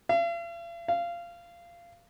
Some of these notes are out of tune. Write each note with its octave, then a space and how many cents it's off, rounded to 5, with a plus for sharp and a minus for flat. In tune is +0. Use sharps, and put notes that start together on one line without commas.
F5 -45
F5 -20